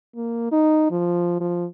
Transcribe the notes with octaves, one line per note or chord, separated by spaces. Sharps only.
A#3
D#4
F3
F3